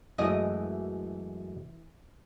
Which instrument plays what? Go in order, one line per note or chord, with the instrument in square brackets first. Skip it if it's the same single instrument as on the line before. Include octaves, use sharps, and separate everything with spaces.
[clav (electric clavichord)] F#2 G#3 A3 [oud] E3 D#5